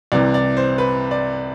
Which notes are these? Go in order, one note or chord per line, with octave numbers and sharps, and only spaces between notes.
C2 C3 E3 D5
D5
C5
B4
D5